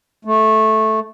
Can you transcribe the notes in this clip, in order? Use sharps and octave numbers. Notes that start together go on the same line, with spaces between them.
A3